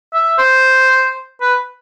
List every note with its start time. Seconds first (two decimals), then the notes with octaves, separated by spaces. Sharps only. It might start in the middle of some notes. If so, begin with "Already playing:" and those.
0.14 E5
0.39 C5
1.41 B4